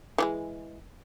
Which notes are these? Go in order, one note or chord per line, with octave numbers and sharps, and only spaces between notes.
E3 F3 G#3